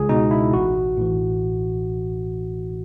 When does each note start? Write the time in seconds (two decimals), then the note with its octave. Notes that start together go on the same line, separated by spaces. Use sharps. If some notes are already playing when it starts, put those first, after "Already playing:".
Already playing: C#2 G#4
0.09 B2 D#4
0.31 E4
0.53 A1 F#4
0.97 A2 E3